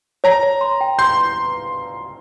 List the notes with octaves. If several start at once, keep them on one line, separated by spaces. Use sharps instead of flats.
C#5 A#5
C#5
C6
G5
C6 G6